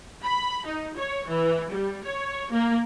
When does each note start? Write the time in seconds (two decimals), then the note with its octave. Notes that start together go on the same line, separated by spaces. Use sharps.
0.23 B5
0.65 D#4
0.97 C#5
1.27 E3
1.71 G3
2.05 C#5
2.52 A#3